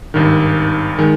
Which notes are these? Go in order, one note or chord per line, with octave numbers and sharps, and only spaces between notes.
G#1 G2 D#3
D#3 G#3